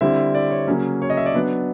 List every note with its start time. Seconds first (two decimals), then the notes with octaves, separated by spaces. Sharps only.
0.01 D3 G3 C4 E4 E5
0.35 D5
0.51 C#5
0.67 C#3 F#3 A#3 C#4
1.02 C#5
1.10 D#5
1.17 E5
1.26 D5
1.34 F#3 B3 D4